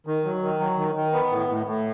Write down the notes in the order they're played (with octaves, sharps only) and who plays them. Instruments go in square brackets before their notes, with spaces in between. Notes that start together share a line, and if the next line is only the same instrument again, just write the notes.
[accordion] D#3
F#3
D#3
F#3
D#3
D#3
B3
A2
A2
A2